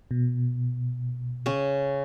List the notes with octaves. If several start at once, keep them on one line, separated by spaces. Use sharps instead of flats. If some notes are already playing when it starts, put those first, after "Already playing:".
B2
C#3 C#4